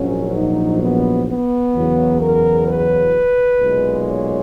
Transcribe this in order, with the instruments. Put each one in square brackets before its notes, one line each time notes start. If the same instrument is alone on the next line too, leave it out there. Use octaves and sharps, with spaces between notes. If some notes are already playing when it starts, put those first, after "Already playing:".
Already playing: [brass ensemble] A#1 G#2 F#3 C#4
D#4
B3
B3
E2 C#3 F#3
A#4
B4
B1 A#2 G#3
C#5